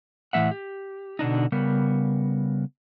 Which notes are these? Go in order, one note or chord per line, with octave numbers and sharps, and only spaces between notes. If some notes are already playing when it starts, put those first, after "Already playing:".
A2 E3 B3 E5 F#5
G4
B2 D3 D4 D#4
C#3 G3 B3 A#4